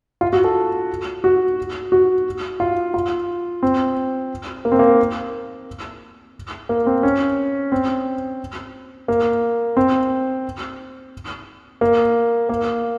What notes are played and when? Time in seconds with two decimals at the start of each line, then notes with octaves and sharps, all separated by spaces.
0.21 F4
0.33 F#4
0.44 A4
1.24 F#4
1.92 F#4
2.60 F4
2.94 F4
3.63 C4
4.65 A#3
4.72 C4
4.79 A#3
6.69 A#3
6.87 C4
7.03 C#4
7.72 C4
9.08 A#3
9.77 C4
11.81 A#3
12.49 A#3